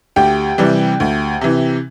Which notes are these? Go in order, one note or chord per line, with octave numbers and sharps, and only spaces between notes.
D2 G4 G5
C3 E3 G3
D2
C3 E3